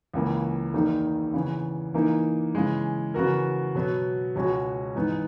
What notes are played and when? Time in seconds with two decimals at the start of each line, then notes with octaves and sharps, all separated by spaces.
0.13 C#2 C#3 E3 A#3
0.74 E2 D#3 A#3 D#4
1.34 C#3 E3 B3
1.94 E3 A#3 D#4
2.55 C#3 E3 G#3
3.14 C#3 E3 B3 F#4 A#4
3.75 B2 F#3 B3
4.35 C#2 B2 G#3 C#4 F#4
4.95 G#2 E3 B3 D#4